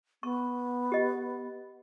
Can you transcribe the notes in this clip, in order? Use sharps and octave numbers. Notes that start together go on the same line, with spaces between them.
B3 C#6
G4 D#5